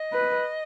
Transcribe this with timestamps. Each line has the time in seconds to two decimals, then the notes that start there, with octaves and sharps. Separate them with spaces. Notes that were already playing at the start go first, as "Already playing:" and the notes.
Already playing: D#5
0.13 B4